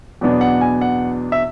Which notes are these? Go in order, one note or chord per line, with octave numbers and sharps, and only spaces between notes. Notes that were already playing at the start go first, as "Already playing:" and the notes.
E2 B2 F#3 B3 D4
F#5
G#5
F#5
E5